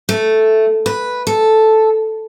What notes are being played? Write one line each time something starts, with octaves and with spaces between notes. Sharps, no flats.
A3
B4
A4